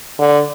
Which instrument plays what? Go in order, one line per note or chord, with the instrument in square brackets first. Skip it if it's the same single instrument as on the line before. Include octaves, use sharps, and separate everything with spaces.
[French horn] D3